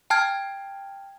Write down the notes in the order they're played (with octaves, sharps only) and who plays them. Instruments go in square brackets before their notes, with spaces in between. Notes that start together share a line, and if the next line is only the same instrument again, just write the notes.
[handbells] G5 A5 F6 G#6